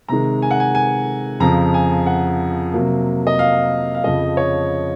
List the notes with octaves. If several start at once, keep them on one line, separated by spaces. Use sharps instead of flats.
C3 D#3 G#3 A#5
G#5
F#5
G#5
G#5
F2 C#3 F3 A#5
G#5
F#5
C3 F#3 A#3
D#5
F5
F5
F2 C#3 F3 D#5
C#5